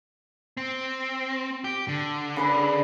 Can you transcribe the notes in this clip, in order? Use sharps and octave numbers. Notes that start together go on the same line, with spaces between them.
C4
G4
D3
C#3 B4 D5